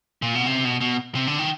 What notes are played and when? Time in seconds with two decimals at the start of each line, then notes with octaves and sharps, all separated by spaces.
0.22 A#2
0.35 B2
0.46 C3
0.65 B2
0.81 B2
1.15 C3
1.27 D3
1.39 D#3